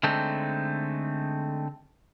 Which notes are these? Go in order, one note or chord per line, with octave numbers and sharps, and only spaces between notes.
D3 G#3 A3 C4 D#4